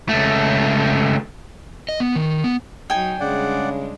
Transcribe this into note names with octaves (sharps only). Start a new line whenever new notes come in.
C#2 A3
D#5
B3
D#3
B3
F#3 D#4 G5 G#5
C#3 G3 G#3 D4 D5 F#5